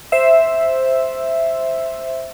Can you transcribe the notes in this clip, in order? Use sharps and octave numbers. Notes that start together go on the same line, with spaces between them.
C5 E5